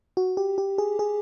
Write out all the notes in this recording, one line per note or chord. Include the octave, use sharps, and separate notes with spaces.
F#4
G4
G4
G#4
G#4